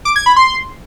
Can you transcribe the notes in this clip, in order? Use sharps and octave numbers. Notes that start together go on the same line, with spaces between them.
D6
G#6
B5
C6